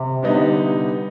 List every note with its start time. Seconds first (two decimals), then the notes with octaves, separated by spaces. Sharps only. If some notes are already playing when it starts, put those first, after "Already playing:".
Already playing: C3
0.23 D3 G3 B3 D#4